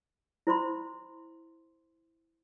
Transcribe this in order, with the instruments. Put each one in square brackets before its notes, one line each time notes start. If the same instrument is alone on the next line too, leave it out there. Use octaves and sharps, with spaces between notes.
[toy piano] E4 C5 B5 C6